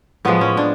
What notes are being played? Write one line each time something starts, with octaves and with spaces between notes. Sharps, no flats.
A2 F3 G#3 B3
C#4
D4